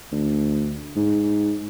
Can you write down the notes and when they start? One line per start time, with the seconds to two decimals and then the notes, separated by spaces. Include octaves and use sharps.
0.12 D2
0.96 G#2